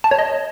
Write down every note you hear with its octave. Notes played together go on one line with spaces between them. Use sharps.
A5
C#5
D#5